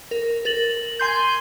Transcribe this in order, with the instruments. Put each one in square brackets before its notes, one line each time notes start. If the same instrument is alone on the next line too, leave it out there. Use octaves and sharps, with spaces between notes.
[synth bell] A#4
A#4 A6 F#7
[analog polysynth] G#5 C6 G6